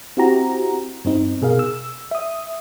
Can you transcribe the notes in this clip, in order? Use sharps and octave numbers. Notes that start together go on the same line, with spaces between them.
C4 E4 F#4 G4 A#5
G2 C4 D#4
B2 G#4 A#4 F5
E6
E5 D#6